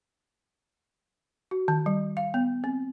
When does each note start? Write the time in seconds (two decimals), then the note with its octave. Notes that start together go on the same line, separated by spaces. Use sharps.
1.51 F#4
1.68 D#3
1.86 G3
2.17 F5
2.34 B3
2.64 C4